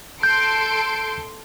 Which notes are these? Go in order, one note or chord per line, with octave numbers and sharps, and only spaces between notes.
A4 C6 G6 D7